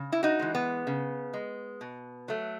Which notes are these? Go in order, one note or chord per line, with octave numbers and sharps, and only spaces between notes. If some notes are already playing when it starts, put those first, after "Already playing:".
Already playing: C#3
E4
D#4 F#4
E3 G#3
B3
C#3
G#3
B2
F#3 A3